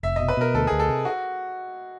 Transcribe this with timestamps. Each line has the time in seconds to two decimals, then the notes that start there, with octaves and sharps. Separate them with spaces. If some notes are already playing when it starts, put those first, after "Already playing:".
0.03 F1 E5
0.16 B2 D#5
0.28 B4
0.37 B2 A#4
0.54 D2 A4
0.67 D2 G#4
0.79 A4
0.88 C3
1.05 F#4